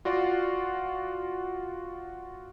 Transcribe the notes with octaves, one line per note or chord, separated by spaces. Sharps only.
F4 F#4 D5 C6